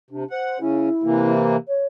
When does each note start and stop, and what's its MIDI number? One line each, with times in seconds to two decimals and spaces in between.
0.10 0.24 48
0.10 0.25 62
0.30 0.58 72
0.30 0.59 78
0.60 0.89 49
0.60 0.89 61
0.60 1.31 64
1.03 1.57 48
1.03 1.57 52
1.03 1.57 58
1.67 1.85 73